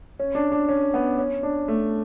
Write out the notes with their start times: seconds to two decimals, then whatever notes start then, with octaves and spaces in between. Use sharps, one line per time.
0.19 C#4
0.35 D4
0.52 D4
0.69 C#4
0.94 B3
1.18 C#4
1.43 D4
1.68 A3